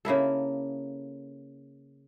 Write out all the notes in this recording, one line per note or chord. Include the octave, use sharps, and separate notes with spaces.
C#3 A#3 E4 A4